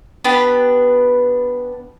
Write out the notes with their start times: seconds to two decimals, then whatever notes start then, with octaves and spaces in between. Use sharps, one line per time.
0.24 B3 D4 G4 B4